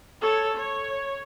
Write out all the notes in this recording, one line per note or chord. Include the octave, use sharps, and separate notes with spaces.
A4 C#5
C#5